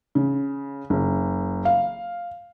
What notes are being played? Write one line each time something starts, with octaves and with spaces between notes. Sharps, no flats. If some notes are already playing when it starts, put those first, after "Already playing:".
C#3
F#1
F5